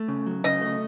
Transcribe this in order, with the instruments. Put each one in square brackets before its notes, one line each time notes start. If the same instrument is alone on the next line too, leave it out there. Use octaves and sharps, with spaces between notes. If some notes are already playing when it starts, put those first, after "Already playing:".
Already playing: [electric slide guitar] A3
C#3
F#3
[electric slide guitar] C#3 [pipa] D#5
[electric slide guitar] A3